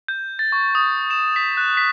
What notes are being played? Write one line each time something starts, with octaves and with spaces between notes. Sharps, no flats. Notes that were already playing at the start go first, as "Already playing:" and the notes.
G6
A6
C#6
D#6
E7
B6
F#6
B6